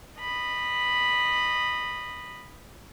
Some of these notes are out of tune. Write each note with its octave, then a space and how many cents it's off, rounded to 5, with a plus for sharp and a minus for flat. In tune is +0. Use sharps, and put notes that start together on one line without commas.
D#5 -20 B5 +0